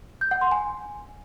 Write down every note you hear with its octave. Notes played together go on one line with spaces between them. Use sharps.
G6
F#5
C6
G#5